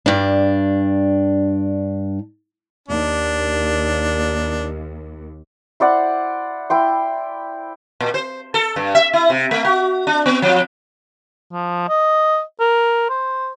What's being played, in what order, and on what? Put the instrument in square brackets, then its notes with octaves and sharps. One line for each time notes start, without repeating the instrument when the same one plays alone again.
[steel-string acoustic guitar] G2 D4
[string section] D#2 [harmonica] D4
[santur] E4 C5 D5 F#5
E4 G5 C6
[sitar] A#2
C5
A4
G2
E5
E4
C3
A3
F#4
D4
B3
F3
[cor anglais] F3
D#5
A#4
C5